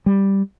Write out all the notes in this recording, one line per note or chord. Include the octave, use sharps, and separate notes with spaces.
G3